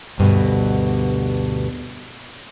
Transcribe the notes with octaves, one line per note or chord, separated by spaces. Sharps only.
D2 G2 B2